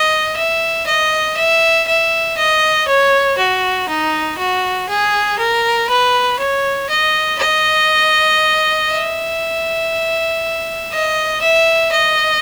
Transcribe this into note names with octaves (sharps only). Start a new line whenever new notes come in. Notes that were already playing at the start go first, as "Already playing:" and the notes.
Already playing: D#5
E5
D#5
E5
E5
D#5
C#5
F#4
D#4
F#4
G#4
A#4
B4
C#5
D#5
D#5
E5
D#5
E5
D#5